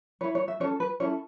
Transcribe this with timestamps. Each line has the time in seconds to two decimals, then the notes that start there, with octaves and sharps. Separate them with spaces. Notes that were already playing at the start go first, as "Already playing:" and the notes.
0.21 E4 B4 C#5
0.35 C#5
0.48 E5
0.60 C#4 C#5
0.64 A4
0.80 B4
1.00 C#4 E4 A4 C#5